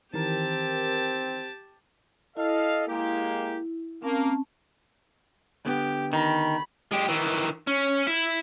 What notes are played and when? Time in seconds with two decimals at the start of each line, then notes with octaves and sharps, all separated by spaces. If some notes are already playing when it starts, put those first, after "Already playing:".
0.14 D#3 E3 C4 G4 A#4 A5
2.37 E4 A4 D#5 F5
2.88 G#3 A#3 G4
4.02 A#3 C4 C#4 A5
5.66 D3 B3 G4
6.13 D#3 B5
6.92 G#3 G4
7.08 D#3 E3
7.67 C#4
8.07 E4